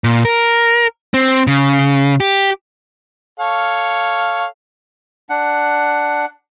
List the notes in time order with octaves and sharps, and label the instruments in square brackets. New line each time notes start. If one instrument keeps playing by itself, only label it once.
[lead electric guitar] A#2
A#4
C4
C#3
G4
[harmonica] A4 C#5 F5
[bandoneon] D4 F#5